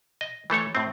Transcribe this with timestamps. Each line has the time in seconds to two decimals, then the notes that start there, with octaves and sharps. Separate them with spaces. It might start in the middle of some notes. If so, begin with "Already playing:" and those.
0.21 D#5
0.50 E3 A3 A4 C#5
0.75 A2 C4